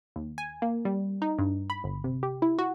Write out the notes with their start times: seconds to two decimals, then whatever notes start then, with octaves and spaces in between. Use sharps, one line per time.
0.16 D#2
0.38 G#5
0.62 A#3
0.85 G3
1.22 D#4
1.39 G2
1.70 B5
1.84 G1
2.04 C3
2.23 G4
2.42 E4
2.59 F#4